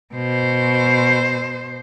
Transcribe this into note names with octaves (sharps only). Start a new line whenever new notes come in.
B2 C5